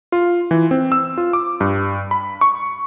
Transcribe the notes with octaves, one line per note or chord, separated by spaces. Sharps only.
F4
E3
C4
E6
F4
D6
G2
B5
C#6